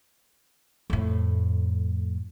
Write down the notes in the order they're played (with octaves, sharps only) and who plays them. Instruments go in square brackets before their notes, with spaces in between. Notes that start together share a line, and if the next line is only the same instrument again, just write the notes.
[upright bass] F2 A2